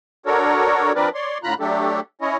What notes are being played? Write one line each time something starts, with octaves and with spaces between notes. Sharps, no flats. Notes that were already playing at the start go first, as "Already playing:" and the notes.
D4 F#4 A4 A#4 C#5
F3 C4 D4 A#4 B4 D5
C#5 D5 C6
A2 D3 F4 A#5 B5 F#6
F#3 A3 D4 G4 A4
C#4 E4 C#5 D#5